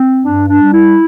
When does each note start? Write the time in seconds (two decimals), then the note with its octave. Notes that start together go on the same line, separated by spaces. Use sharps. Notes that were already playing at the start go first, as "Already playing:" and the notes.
Already playing: C4
0.25 G2 D4
0.49 D4
0.60 G3
0.73 E4